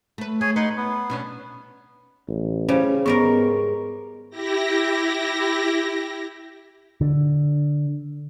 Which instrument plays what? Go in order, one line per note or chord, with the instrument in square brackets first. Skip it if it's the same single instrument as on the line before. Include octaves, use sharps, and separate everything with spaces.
[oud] A3 B4
[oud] A3 [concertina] G#4 C#5 G#5
[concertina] D#4 F#5 C6 [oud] B4
[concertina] B3
[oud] B2 C#4 D4
[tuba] A1
[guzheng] C#3 G3 [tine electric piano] C#4 C5
[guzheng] G#2 G3 A#4 [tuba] B3 [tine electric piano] C#6
[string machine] E4 G4 A#6
[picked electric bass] D3